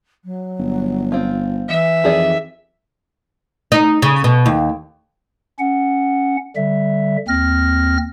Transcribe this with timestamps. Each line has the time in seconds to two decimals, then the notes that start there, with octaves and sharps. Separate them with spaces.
0.25 F#3
0.59 G1
1.12 C4 F4
1.68 E3 E5
2.04 F2 D#3 G#4 D5
3.72 D#4
4.02 C#3
4.24 B2
4.46 D#2
5.59 C#4 F#5
6.56 D3 G3 E5
7.28 D#2 C4 F6 A#6